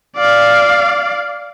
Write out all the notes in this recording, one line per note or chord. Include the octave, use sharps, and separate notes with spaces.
D5 F5